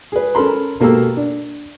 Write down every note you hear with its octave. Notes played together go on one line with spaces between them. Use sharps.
G#4 B4
C#4 A4 A#4 B5 C6
B2 A#3 G4 A4 E6
D4